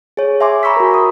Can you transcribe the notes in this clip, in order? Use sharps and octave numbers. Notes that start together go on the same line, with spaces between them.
G#4 C#5
E5 G#5 C6 D6
A#5 B5 C#6 E6 B6
F#4 A#4
D#6